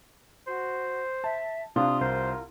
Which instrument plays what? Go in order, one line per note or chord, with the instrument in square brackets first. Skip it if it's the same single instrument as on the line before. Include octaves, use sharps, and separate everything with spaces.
[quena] F#4 [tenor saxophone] C5
[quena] E5 [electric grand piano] A5
[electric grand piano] C3 D4 [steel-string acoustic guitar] F4 [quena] D#6
[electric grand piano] C2 [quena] A#4 [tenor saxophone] C5